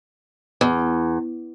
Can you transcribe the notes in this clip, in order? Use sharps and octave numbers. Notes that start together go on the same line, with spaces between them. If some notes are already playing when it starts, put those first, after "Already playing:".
E2